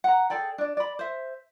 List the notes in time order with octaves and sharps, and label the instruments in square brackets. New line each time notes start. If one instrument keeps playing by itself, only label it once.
[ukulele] F#5 A#5
G#4 A4 D5 G5
D4 D5
D5 B5
C5 E5